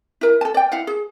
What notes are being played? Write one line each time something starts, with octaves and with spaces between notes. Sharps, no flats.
E4 A#4
A4 A5
D5 G5
E4 F5 F#5
G#4